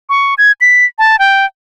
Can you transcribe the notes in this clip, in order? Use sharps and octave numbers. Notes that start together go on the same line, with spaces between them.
C#6
G#6
B6
A5
G5